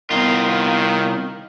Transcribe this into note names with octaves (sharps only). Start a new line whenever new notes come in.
C2 D#3 B3 F4